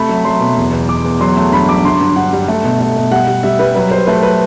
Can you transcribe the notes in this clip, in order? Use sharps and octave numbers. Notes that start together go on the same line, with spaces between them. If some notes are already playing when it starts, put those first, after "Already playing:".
Already playing: C3 A3 B5
F#3
F#3 C6
B2
E2
E2
E2 D6
E2
F#3 C6
A3
G2 B5
F#3 D6
D3 C6
G2
G2 F#5
G3
A3
B2
A3
B2
G3 F#5
G3
G3 E5
G3 B4
F#3 B4
F#3 C5
A3 B4
B4